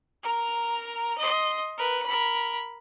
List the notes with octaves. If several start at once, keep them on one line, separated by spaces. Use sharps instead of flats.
A#4 A#5
D#5 C6
A#4 B4
A#4 B5